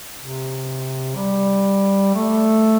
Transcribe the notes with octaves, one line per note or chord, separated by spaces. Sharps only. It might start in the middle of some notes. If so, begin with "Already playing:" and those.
C3
G3
A3